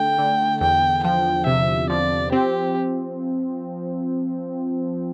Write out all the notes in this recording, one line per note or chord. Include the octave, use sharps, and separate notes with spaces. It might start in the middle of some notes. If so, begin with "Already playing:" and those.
Already playing: D3 A3 G5
D3
E2 G5
F3 G5
C3 E5
F3 D5
C4 G4